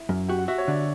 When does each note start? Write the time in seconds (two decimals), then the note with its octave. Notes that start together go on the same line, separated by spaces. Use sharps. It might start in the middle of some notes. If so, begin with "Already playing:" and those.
Already playing: E4
0.09 F#2
0.29 F#4 G4
0.39 F#5
0.48 F#4 E5
0.58 C#5
0.68 D3 D5